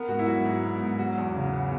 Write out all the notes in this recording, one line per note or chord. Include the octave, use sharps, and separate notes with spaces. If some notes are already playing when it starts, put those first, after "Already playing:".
Already playing: B3 A#4
G#2 F#4
E4
F#3 F#4
G#2
B3
G#2
F#3 F#4
E2
C#3
B3